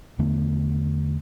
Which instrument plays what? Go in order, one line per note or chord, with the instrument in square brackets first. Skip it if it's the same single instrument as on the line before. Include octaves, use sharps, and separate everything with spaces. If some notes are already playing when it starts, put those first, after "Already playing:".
[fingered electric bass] E2 D3 A3 B3